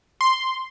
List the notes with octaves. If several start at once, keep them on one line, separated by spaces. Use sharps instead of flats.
C6